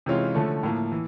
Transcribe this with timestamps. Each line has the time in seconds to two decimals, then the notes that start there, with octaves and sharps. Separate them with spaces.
0.06 C3 E3 G#3 C#4 F4
0.35 D3 F3 A3 C#4
0.63 A2 F3 A#3
0.92 E3